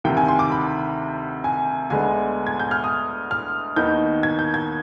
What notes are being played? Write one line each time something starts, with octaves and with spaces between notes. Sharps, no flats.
D2 C3 D#3 G5
G#5
C6
D6
B5
G#5
D2 D3 G#3 B3 G#5
G#6
G6
F6
D#6
F6
D#2 D#3 B3 D#4 G6
G#6
G6
G#6